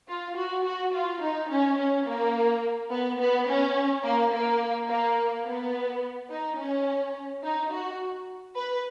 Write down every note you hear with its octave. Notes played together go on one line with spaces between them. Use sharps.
F4
F#4
F#4
F4
D#4
C#4
C#4
A#3
B3
B3
C#4
A#3
A#3
A#3
B3
D#4
C#4
D#4
F#4
B4